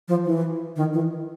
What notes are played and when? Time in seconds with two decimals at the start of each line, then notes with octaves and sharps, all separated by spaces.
0.08 F3
0.25 E3
0.76 D#3
0.93 E3